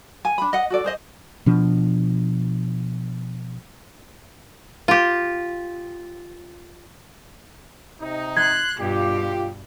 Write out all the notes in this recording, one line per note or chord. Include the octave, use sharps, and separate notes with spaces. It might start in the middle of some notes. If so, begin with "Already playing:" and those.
G#5
D4 B5
D#5 F#5
F#4 A4 D5
G#4 C5 D#5
B2 F3 D4
F4 G4
C3 D#4
C6 F#6 G#6
G2 B2 F4 G4